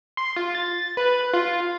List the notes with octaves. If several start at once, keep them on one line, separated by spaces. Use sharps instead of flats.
C6
F4
A6
B4
F4